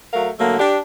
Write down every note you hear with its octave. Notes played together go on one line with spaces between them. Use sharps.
F#3 A3 A#4 F5
D3 F#3 A3 A#3
D4 G4